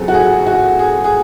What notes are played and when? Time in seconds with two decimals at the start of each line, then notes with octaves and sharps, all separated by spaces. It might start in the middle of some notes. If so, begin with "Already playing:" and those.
Already playing: E2 C#3 F#3 C4 A4
0.08 F#4
0.14 G#4
0.46 F#4
0.79 G#4
1.04 G#4